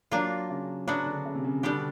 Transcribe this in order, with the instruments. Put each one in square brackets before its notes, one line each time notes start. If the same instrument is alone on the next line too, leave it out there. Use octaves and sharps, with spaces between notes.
[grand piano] F#3 [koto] A#3 D4 F4
[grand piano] C#3
[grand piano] C#3 [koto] F#3 B3 D4 F#4
[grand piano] D3
C#3
C3
C#3
[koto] B2 G3 B3 D4 G4 [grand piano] D3